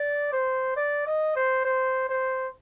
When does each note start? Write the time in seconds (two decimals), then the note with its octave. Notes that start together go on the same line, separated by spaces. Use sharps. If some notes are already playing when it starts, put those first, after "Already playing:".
Already playing: D5
0.32 C5
0.76 D5
1.06 D#5
1.35 C5
1.65 C5
2.09 C5